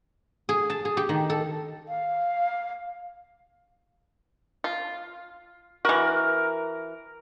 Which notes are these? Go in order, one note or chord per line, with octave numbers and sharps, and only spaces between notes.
G#4
A5
G#4
G4
D#3
A4
F5
F4
E3 F#4 A#4